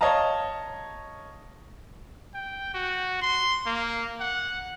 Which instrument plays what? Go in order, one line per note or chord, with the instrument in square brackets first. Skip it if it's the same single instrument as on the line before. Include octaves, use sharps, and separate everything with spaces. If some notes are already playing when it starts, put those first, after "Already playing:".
[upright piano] C#5 D#5 F5 A5 A#5
[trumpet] G5
F#4
C6
A#3
F#5